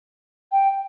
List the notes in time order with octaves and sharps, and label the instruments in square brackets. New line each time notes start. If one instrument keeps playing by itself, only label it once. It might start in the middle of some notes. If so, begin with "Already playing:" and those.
[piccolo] G5